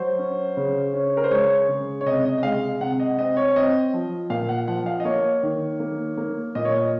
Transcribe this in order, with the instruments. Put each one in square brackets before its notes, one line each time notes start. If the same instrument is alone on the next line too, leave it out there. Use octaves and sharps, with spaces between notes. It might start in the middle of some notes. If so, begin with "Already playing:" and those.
Already playing: [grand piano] F#3 C5
C#4
C#3
C#4
A#4
C5
G#3 C#5
C#3
C#5
C3 D#5
D#5
D#5
G#3 F5
C3 F#5
D#5
C4 D#5
C#5
C4 D#5
F3
A#2 F5
F#5
F3 F#5
F5
D#5
A#3 C#5
D#3
A#3
A#3
A#2 D#5
C#5
D#5